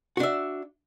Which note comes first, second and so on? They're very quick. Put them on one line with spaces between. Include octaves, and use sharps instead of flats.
F#4 D4 E5